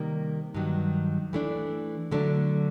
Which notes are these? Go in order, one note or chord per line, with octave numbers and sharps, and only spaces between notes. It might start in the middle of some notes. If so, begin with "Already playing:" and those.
Already playing: C3 D#3 G3 A#3
G2 D#3 F#3
E3 A3 D4
D3 F#3 A3 D4